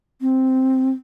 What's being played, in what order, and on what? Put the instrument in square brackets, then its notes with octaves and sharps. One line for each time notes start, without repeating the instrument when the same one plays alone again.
[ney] C4